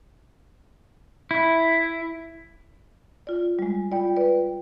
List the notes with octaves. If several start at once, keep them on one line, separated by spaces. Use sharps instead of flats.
E4
F4 D5
G3 G#3
F4 D5 G5
B4 D5